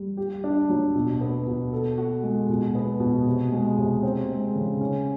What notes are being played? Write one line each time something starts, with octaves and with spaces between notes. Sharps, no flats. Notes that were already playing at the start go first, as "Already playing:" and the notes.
Already playing: G3
G4
D4
F#3
B2
B3
B2
A4
F#4
G#3
B2
B3
B2
C3
G#3
C3
C4
G#3
C#3
C#4